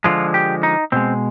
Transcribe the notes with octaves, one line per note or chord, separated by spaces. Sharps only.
D3 F3 G#3 F4
G4
D#4
B2 G#3 C4